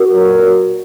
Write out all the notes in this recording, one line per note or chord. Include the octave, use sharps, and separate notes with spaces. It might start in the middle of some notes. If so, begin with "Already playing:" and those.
Already playing: F#4 A#4
A#2 F#3